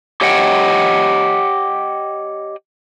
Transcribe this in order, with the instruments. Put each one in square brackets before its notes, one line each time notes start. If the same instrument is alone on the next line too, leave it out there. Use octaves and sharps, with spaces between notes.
[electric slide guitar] G4 C#5 D#5 F#5 G5